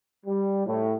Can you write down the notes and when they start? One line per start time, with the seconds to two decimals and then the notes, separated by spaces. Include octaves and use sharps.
0.26 G3
0.66 A2